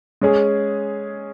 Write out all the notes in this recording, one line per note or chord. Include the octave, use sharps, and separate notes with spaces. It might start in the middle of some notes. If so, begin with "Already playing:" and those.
G#3 C#4 G#4